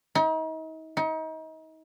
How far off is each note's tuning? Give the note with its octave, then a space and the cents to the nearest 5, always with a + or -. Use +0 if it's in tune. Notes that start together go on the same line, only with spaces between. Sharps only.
D#4 +40
D#4 +35